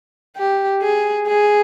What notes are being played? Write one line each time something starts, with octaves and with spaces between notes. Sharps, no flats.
G4
G#4
G#4